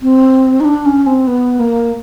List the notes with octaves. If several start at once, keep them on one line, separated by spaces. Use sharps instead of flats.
C4
D#4
D4
C#4
C4
B3
A#3